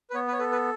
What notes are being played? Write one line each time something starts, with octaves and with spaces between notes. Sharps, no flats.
B4
B3 C#5
B4
C#5
A4 B4
B4